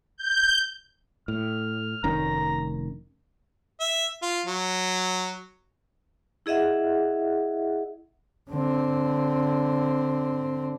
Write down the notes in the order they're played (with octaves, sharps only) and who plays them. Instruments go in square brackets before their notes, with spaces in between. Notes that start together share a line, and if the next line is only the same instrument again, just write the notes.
[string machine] G6
[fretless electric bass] A2 [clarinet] F6
[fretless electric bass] F1 D#3 C#4 [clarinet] A#5
[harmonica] E5
F4
F#3
[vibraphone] E4 G#4 D#5 E5 F#5
[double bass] D3 C4